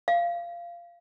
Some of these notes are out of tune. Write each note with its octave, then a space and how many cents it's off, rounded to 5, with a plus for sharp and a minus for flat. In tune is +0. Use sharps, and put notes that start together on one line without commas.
F5 -15